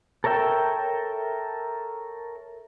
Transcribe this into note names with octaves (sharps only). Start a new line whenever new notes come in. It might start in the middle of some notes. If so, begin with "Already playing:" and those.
A4 A#4 C#5 E5 G5